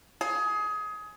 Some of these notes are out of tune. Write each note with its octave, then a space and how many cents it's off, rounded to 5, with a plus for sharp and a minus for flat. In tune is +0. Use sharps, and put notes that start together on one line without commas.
G#4 +20